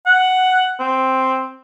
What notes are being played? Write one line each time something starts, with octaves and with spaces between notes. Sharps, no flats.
F#5
C4